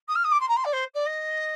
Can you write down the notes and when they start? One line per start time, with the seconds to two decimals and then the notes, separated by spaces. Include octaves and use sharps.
0.08 D#6
0.15 F6
0.24 D#6
0.31 D6
0.40 C6
0.48 A#5
0.56 C6
0.64 D5
0.72 C5
0.94 D5
1.05 D#5